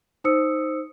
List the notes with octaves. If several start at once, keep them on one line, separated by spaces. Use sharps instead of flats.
D#4 C5 D#6 E6 C#7